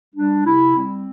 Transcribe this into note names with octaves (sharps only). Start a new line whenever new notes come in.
G3 D4
C3 E4
G3 C4